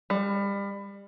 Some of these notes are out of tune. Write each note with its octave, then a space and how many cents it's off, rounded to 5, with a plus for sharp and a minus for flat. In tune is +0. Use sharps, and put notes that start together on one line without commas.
G3 +30